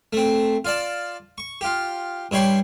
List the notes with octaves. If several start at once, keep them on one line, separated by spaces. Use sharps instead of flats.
A3 C4
F4 D5 A5
C#6
F4 G4
G2 E4 C#5 G5 C6